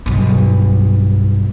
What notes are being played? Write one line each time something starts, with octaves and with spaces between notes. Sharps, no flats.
B1 G2